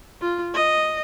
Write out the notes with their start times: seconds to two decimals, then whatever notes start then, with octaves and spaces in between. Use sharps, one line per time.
0.21 F4
0.54 D#5